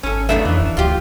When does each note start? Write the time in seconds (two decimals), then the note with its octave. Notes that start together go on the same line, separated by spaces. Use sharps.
0.03 G#1 C#4 A4
0.29 D#2 C3 A3 B3 D4 E5
0.45 F2 E3
0.60 D1
0.77 D2 F4 G4